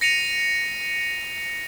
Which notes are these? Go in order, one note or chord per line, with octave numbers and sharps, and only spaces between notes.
A#6 C#7 D#7 F7